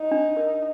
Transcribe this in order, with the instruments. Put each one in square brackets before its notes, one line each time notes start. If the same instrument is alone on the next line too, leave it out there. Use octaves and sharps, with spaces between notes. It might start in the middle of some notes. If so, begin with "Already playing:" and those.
Already playing: [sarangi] D#4
[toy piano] D4
A#4